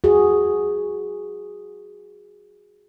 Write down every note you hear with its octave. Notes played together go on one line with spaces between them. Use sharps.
F#4 G#4